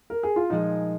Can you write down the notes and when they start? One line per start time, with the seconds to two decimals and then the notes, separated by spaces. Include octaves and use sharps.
0.10 A#4
0.23 G#4
0.36 F4
0.50 A#2 F3 G#3 D#4 F4 G#4